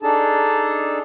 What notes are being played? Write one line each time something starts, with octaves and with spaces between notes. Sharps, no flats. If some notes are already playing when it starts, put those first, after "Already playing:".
D4 D#4 G#4 A4 A5